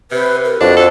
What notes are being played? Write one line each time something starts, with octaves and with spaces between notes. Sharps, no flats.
C3 B4
A#4
F2 D4 F#4
A4